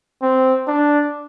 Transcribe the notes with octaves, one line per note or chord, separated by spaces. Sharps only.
C4
D4